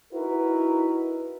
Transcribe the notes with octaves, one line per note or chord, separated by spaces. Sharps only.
D#4 E4 F#4 A#4 B4